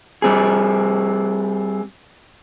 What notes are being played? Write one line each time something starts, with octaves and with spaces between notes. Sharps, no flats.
G3 C4 G#4